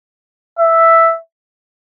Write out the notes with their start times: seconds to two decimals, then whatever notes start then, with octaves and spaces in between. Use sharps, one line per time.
0.59 E5